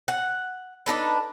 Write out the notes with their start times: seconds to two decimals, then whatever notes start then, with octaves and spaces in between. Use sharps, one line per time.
0.08 F#5
0.86 D4 D#4 A4 B4